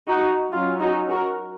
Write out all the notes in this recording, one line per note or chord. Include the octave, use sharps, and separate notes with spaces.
D#4 F#4
F#3 C#4 F4
D#4 F#4
F#4 A#4